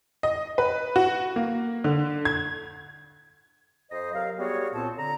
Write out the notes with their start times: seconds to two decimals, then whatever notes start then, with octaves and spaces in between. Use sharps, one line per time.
0.23 D#5
0.58 B4
0.96 F#4
1.36 A#3
1.84 D3
2.25 G#6
3.90 F2 C5 D#5
4.13 C3 F#3 A#4 F5
4.38 G3 B3 F#4 G#4 C#5
4.74 C2 A#2 C4 F4 A5
4.96 D3 A#5